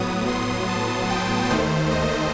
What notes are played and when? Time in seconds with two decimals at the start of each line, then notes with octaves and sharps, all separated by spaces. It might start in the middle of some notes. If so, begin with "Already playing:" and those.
Already playing: A2 F#3 B3 D#6
0.28 C6
0.68 A5
1.10 G5
1.50 D#2 D#3 A3 C5
1.91 D#5